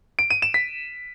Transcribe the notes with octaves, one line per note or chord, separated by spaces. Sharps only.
D7
D#7
E7
B6